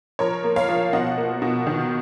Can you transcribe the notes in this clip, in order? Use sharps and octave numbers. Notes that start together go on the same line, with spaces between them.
F3 A#4 C#5
A#3
C#5 F5
F3
B2 D#5 F#5
A#3
B2
D#3